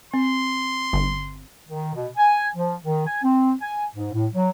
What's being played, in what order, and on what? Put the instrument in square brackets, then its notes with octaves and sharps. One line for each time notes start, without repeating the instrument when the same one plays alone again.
[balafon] C4 [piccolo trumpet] C6
[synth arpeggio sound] G1
[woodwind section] D#3
B2
G#5
F3
D#3
G#5
C4
G#5
G#2
A2
F#3